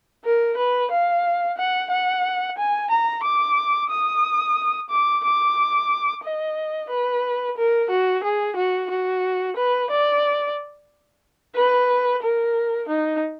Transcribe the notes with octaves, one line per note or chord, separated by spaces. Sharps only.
A#4
B4
F5
F#5
F#5
G#5
A#5
D6
D#6
D6
D6
D#5
B4
A#4
F#4
G#4
F#4
F#4
B4
D5
B4
A#4
D#4